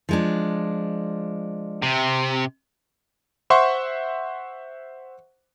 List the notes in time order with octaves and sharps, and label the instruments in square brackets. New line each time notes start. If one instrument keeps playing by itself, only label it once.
[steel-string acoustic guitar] F3 G#3 D4
[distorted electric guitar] C3
[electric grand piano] C5 E5 F#5 C6 C#6